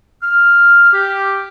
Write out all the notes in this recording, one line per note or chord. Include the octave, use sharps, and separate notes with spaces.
F6
G4